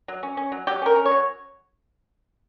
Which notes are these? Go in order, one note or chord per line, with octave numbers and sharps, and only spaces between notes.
F#3
C#4
C#4
F#3
F#3 G4
C#4 A#4
C#4
C#5
F#3